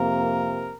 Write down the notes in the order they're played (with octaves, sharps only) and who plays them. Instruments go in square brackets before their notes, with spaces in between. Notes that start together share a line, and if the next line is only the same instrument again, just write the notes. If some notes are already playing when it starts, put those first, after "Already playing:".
Already playing: [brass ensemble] F2 C3 A#3 A#4